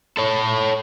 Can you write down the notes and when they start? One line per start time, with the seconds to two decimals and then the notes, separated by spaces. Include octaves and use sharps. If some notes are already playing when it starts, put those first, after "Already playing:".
0.17 A4 C#5